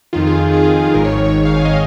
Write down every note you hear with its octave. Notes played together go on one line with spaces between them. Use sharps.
F2 D#3 F4
G#4
G#4
G#4
F4
G#4
G#1 G#2 D#3 A#4
C#5
C#5
C#5
C#5
F5
G#5
D#5